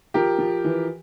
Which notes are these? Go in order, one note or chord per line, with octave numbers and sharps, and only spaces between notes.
F3 G4 A#4
F3
E3